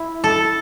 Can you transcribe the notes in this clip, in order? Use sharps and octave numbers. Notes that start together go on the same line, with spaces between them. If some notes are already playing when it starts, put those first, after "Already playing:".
Already playing: E4
A4